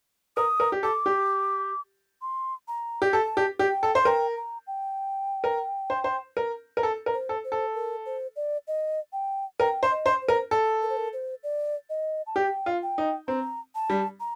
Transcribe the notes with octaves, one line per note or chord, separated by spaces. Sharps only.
A#4 D#6
A#4
G4
A4 D6
G4
C6
A#5
G4
A4 A5
G4
G4 G5
A4
C5
A#4 G5
A#5
G5
A#4
C5
C5
A#4
A#4
A4
A#4
C5
A4
C5
A4
A#4
C5
D5
D#5
G5
A#4 G5
C5
D#5
C5
C5
A#4
A4
A#4
C5
A#4
C5
D5
D#5
A5
G4 G5
F4
G5
D#4
C4 A#5
A5
G3
A#5